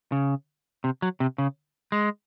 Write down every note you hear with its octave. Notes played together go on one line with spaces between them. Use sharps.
C#3
C3
F#3
C3
C#3
G#3